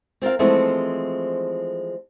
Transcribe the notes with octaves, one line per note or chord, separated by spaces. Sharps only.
C4 F4 A#4 F5
E3 F3 G#3 A3 B3 C4